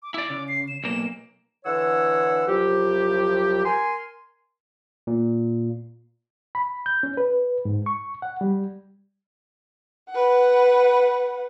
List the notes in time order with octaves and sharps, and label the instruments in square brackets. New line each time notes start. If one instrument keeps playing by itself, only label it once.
[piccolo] D6
[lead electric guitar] E4 D5 [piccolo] D6
[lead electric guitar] C#3
[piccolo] C7
E7
[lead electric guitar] B1 A#3 [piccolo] E7
[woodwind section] D3 E3 C#5 F#5 E6
C2 F3 F#3 G4
A#4 G#5 C6
[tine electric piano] A#2
[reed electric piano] B5
G6
C#4
B4
G#2
C#6
F#5
G3
[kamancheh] B4 F#5